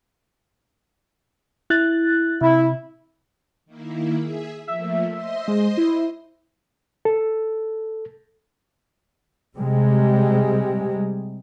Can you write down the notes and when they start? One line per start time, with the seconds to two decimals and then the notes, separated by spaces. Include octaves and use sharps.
1.70 E4 F#6 A6
2.41 C3 E4
3.66 D#3 A#3 E4
4.17 G#4 E5
4.68 F3 A3 A#3 E5
5.12 C5 D#5 C6
5.48 G#3
5.77 E4
7.05 A4
9.58 C3 G3 G#3